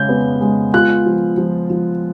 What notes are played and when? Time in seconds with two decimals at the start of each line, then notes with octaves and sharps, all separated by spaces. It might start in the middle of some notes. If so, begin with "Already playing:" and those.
Already playing: C#3 G#3 G6
0.09 B3
0.41 G#3
0.74 F4 F#6
1.06 F3
1.38 F3
1.70 F3